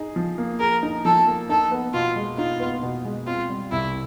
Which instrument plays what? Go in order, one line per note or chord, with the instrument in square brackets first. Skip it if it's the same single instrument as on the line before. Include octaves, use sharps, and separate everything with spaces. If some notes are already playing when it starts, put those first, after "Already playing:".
Already playing: [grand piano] D#4 G#4
F3
A#3
[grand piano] G#4 [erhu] A#4
[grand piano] D#4
[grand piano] F3 [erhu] A4
[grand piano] A#3
[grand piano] D#4 [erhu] A4
[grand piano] B3
[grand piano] B2 [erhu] F4
[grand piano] G#3
[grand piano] D#4 [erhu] F4
[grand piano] B3
B2
G#3
[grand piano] C4 [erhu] F4
[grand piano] G3
[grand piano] C2 [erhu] E4